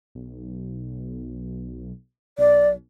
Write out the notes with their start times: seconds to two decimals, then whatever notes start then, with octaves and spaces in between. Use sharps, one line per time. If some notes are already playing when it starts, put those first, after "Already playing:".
0.15 B1
2.38 B1 D5